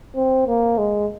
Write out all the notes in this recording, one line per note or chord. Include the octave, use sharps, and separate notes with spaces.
C4
A#3
G#3